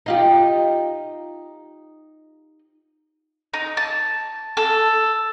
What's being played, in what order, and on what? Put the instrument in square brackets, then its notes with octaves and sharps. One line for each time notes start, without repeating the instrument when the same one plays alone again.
[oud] D#4 F4 G4
[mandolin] D#4
A5
A4